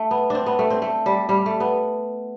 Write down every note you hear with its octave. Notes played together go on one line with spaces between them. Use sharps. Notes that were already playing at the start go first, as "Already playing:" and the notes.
Already playing: A3
B3
C4 D4
B3
A3
C4
A3
G3
G3
A3
B3